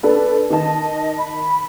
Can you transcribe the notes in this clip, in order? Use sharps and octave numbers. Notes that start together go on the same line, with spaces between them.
D4 A4 B4 D5
D#3 D#5 A5
B5